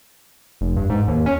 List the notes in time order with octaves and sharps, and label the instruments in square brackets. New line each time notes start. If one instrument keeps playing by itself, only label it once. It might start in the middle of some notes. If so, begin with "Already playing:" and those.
[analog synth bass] F1
G2
G#2
D#2
C#4